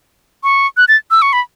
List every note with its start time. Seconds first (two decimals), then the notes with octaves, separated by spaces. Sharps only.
0.43 C#6
0.77 F#6
0.88 A6
1.11 E6
1.22 C#6
1.33 B5